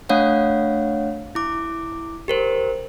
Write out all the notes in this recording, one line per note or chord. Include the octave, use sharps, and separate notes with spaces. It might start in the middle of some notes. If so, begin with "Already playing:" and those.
A3 D4 C#5 F5 F#5
E4 D6
G4 A#4 C5